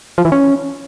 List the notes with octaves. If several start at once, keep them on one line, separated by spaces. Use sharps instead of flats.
F3
E3
C#4